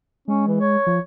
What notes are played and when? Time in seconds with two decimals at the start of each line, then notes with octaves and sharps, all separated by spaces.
0.28 G#3 C#4
0.47 E3
0.61 C#5
0.87 F3